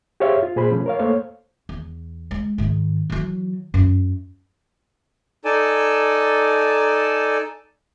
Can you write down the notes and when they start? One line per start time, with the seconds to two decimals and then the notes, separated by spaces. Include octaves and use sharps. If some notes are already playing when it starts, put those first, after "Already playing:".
0.20 G4 G#4 C5 C#5 E5 F5
0.43 F4
0.56 A#2 G#4 C5 B5
0.71 B2 F3 A3 C#4
0.86 A#4 C#5 F5
0.99 A3 A#3 A4 C5 C#5 F5
1.69 E2
2.31 G#3
2.58 G#2 D#3
3.10 E3 F#3
3.74 F#2
5.45 D#4 A4 D5 G#5 A5